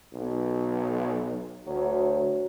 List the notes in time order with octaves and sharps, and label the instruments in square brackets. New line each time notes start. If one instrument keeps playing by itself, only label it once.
[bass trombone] B1
[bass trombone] D2 [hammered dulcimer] F#3